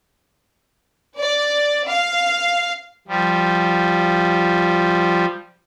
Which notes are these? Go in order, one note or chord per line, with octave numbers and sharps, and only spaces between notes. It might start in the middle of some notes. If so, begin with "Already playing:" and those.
D5
F5
F3 G3